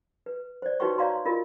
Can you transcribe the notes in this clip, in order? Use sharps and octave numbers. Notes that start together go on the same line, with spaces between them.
B4
C5 D5
D#4 F#4 B4 C#5 G5 C#6
C#5 D5 F5 A#5 C6
F4 A#4 D#5